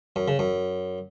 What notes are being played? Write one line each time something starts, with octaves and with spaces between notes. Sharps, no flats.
F#2
C#3
F#2